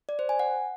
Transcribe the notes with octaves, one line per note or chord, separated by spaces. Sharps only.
D5
C5
G#5
F#5